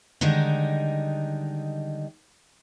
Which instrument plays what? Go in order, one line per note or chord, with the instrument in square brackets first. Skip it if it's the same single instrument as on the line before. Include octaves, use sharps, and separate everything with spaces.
[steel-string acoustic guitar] D3 D#3 G3 G#3 D#4